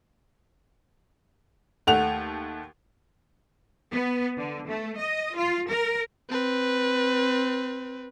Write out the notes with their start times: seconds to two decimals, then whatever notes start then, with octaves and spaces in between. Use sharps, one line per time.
1.87 D#2 A3 F#5 F7
3.91 B3
4.37 D3
4.68 A3
4.98 D#5
5.36 F4
5.70 A#4
6.29 C4 B4